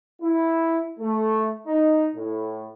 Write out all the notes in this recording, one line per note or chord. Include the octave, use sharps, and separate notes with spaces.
E4
A3
D#4
A2